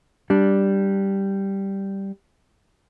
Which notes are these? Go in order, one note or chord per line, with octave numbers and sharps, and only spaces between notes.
G3 D4